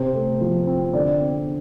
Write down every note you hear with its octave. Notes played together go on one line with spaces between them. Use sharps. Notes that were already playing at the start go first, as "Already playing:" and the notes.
Already playing: C3 C5
A3
F3
C4
D3 D5
C4